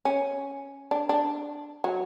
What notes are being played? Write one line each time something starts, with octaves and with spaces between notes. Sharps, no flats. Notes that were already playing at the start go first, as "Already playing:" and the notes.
C#4
D4
D4
F#3